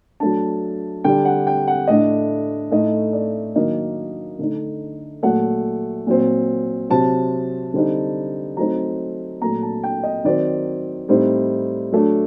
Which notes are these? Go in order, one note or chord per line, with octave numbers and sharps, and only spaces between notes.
F#3 A3 D4 A5
D3 G3 D4 G5
F#5
G5
F#5
A2 A3 D4 D#5
A2 A3 D#4 D#5
D5
D#3 F#3 A#3 D4 D#5
D3 A3 D#4
A#2 F#3 A3 F#5
A#2 F#3 C4
C3 F#3 C4 A5
D3 G3 C4 D#4
F#3 A3 C4 D#4 A#5
A#2 F#3 A3 A#5
A5
G5
D#5
D#3 F#3 C4 D5
A2 G3 C4 D#4
F#3 A3 D4